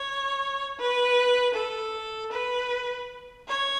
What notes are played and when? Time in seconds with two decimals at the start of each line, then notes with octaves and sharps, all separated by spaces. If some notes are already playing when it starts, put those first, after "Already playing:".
Already playing: C#5
0.78 B4
1.55 A4
2.32 B4
3.48 C#5